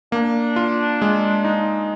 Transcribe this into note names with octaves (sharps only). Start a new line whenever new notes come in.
A#3 D4
F4
G#3
D#4